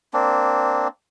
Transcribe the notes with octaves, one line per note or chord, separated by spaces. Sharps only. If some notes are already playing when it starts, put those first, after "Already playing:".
A#3 C4 D4